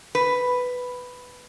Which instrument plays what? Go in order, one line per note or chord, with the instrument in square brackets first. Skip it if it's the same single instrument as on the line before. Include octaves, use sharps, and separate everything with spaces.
[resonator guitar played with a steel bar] B4